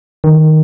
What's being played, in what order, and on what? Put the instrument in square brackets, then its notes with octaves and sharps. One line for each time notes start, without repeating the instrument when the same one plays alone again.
[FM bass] D#3